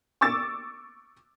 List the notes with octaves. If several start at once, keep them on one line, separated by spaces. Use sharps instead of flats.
C#6 D6 E6 A6